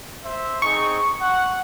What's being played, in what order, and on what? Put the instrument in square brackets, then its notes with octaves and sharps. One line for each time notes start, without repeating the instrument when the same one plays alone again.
[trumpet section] C5 E5
[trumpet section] C4 D#4 G#4 [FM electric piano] C#6
[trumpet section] F#5